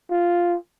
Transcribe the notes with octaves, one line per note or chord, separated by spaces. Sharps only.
F4